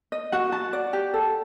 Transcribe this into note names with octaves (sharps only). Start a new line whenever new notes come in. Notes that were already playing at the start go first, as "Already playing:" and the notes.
D#5
F#4 F#5
F#4 A5
D5
G4
A4